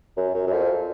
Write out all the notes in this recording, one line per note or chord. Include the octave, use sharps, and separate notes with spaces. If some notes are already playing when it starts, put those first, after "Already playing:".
F#2
F#2
F#2
F2